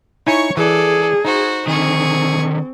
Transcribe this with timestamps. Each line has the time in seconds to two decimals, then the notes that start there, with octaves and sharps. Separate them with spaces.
0.27 D#4 E4 C#5 G#5 C#6
0.57 E3 G#4 A4 D5
1.25 D#4 F#4 C5
1.67 D3 D#3 C4 G#4 C#6